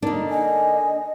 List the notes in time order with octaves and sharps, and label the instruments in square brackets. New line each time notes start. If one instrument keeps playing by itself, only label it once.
[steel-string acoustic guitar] D3 A#3 [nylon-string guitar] D4 [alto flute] D#4
[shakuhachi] D#5 [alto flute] G#5